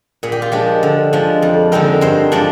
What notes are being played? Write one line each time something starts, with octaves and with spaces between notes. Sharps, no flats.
A#2 G#4
G4
F4
F3 G#3 D4 G4
D3
F3 G#3 D4
F2
D3 G#3 C4 D#4 A#4
G2 C5
F3 G#3 D4 D5